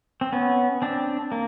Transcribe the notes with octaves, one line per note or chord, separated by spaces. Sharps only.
C4
B3 C#4
C4 D4
A#3